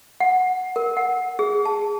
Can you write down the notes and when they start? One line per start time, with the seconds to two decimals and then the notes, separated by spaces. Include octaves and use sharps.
0.20 F#5
0.76 A#4
0.97 F#5
1.39 G#4
1.66 A5